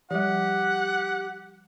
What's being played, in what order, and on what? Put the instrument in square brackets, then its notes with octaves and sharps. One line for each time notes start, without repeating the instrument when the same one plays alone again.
[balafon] F3 G3 [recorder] G4 [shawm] F#5